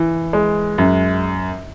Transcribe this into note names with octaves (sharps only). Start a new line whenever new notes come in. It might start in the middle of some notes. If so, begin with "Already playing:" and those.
Already playing: E3
G#3
F#2